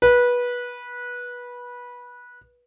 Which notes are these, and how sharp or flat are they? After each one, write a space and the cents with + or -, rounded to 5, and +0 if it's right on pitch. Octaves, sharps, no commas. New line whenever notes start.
B4 -20